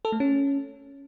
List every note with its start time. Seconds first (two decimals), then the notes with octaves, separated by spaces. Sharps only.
0.05 A4
0.12 A3
0.20 C#4